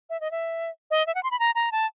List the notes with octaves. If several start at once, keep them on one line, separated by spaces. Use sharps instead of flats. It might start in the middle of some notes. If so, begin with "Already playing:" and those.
E5
D#5
E5
D#5
E5
F#5
C6
B5
A#5
A#5
A5